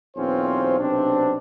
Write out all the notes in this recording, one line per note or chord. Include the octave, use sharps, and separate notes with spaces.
B1 E2 C4 C#4 F4 C5
B1 C3 C4 D4